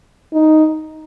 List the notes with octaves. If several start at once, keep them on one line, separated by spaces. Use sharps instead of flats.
D#4